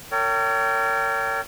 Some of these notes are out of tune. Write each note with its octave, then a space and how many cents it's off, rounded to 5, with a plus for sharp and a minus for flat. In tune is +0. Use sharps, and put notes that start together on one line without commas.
A#4 -40 C#5 +30 G5 -20